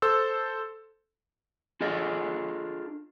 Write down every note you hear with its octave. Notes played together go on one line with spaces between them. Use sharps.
A4 C5 E6
D4 F4 G#4 A4 D#5